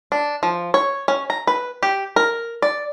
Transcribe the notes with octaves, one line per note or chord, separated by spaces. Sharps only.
D4
F3
C#5
C#4
A#5
B4
G4
A#4
D5